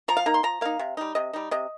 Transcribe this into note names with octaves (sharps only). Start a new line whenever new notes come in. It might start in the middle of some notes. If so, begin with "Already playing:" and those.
F3 A#5
F5
A#3 D#4 A#5
C6
F3 A#5
A#3 D#4 F5
C3
G3 D#4
C3 D#5
G3 D#4
C3 D#5